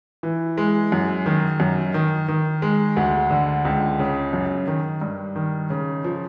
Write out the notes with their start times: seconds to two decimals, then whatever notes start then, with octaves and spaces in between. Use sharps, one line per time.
0.23 E3
0.58 G#3
0.92 F#2
1.26 D#3
1.60 F#2
1.94 D#3
2.28 D#3
2.62 G#3
2.97 D2
3.31 D3
3.65 C#2
3.99 C#3
4.33 F#2
4.67 D#3
5.02 G2
5.36 D#3
5.70 C#3
6.04 F3